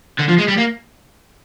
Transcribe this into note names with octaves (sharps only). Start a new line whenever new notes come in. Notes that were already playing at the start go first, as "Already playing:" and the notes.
D3
F3
G#3
G3
A#3